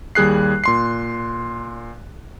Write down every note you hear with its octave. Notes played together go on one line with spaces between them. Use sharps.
D#2 G3 G#4 F#6 C7
A#2 C6 C7